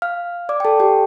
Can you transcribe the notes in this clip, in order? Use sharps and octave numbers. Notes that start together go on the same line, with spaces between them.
F5 F6
D5 D6
G5
A4 A5
G4 G5